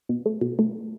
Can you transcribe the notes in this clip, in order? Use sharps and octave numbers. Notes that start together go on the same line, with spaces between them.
B2
A3
B2
A3